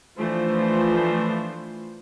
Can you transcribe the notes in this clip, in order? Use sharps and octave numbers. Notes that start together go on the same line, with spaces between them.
E3 F3 A3 D4 F4 C5